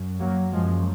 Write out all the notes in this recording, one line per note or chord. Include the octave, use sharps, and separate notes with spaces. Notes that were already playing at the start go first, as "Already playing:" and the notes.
Already playing: F#2
F#3 A#3
F#2 F3 G#3